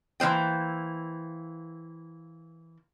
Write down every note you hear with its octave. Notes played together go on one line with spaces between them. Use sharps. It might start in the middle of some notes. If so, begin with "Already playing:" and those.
E3 A#3 C5 G5